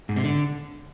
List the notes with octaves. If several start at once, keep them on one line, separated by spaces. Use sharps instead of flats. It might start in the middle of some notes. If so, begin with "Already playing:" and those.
G#2
C3
D3